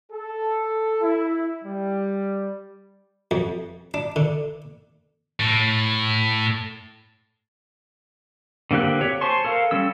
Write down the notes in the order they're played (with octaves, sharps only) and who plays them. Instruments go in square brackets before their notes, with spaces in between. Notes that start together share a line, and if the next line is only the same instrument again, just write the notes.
[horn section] A4
E4
G3
[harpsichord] F2
D4
D3
[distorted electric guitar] A2
[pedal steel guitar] D3 A#3 C4 G4 F#6
G4 C#5
C5 G#5 A5 C6 C#6
A4 A#4 F5
G3 C#4 E6